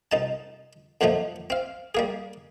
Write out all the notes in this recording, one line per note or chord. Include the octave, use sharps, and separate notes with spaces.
C2 D#4 A5
F2 A#2 F3 F#3 A3 D#4
C4 F5
G3 A#3 G#4